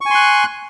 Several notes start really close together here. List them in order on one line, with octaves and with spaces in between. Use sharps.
C#6 G#5 C6 F#6